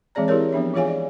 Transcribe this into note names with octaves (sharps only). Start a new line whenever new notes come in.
E3 G#3 C4 G#4 D5 A#5
E4 G4 G#4 A#4 C#5
F3 B3 D4 E5
E3 F4 G#4 C#5 F5 G#5
D5